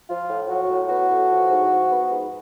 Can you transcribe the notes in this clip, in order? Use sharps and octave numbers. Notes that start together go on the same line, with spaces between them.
F3 F4
A2
F#3 F#4
A2
B3 F#4
A2
F3
G#2
F3
B3
G#2